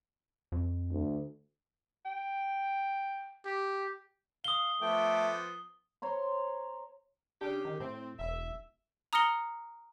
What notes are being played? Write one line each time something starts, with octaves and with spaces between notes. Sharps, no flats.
F2
D2
G5
G4
F5 D#6 G7
F3 A3 B3 G5 D6
C5 C#5 A#5 C6
C#3 D4 G4
D#3
A2 C4
E1 E5
A#5 D#6 F6 A#6 C#7 G7